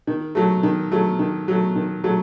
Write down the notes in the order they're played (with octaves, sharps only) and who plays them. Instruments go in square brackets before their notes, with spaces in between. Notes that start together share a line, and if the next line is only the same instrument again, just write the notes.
[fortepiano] D#3
F#3 A3
D#3
F#3 A3
D#3
F#3 A3
D#3
F#3 A3